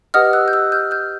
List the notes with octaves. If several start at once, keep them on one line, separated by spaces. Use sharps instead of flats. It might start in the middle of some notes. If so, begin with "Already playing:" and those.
G4 B4 D#5 F#5 D#6 F6
E6 F#6
G6
E6 F#6
F6 G6
F6 G6